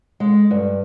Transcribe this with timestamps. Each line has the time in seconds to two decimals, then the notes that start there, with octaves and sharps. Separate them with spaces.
0.20 G#3
0.51 G2